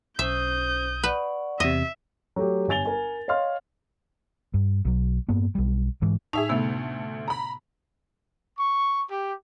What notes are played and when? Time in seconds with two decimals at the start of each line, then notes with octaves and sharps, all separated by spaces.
0.19 B1 C#4 C5 E5 D#6 G6
1.03 B4 D5 F#5 C#6
1.60 E2 C3 D#5 E5
2.36 F#3 A3 G4
2.68 G1 C#5 G#5 A6 F7 G7
2.85 A#4 G#5
3.28 C#5 D#5 F5 C6 F6
4.54 G2
4.85 B1 F#3
5.29 G2 A#3 B3
5.55 B1 G3
6.02 G#2 E3 G#3
6.33 A2 D#4 G#4 E5 A5 F7
6.49 D2 C3 A3 B3
7.28 A#5 B5
8.57 C#6
9.09 G4